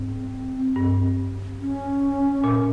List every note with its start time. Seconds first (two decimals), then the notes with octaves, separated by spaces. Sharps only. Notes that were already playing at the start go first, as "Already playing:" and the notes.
Already playing: G#2 C4
0.76 G2
1.61 C#4
2.44 A#2